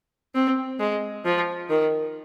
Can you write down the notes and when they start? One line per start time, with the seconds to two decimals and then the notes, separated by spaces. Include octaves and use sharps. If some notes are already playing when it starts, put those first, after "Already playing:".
0.35 C4
0.80 G#3
1.25 F3
1.70 D#3